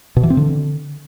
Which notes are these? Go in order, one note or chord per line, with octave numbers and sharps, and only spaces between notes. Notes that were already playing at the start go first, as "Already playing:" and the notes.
B2
E3
C4
D3